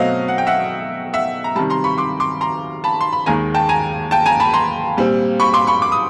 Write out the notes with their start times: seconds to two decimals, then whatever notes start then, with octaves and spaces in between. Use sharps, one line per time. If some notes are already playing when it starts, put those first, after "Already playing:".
Already playing: B2 F#3 A3 C4 D#5 F5
0.28 F#5
0.38 G5
0.47 E5 F#5
1.13 E5 F#5
1.44 A#5
1.55 G3 A5 B5
1.58 C3 D#3
1.70 A#5 C6
1.84 B5 C#6
1.98 C6 D6
2.20 C6 D6
2.41 A#5 C6
2.84 A5 B5
3.01 C6
3.13 B5
3.26 D#2 D#3 G#3 G#5 A#5
3.54 G5 A5
3.69 G#5 A#5
4.11 G5 A5
4.26 G#5 A#5
4.40 A5 B5
4.54 A#5 C6
4.97 A#2 G3 C4
5.40 B5 C#6
5.54 C6 D6
5.67 B5 C#6
5.82 D6
5.92 D#6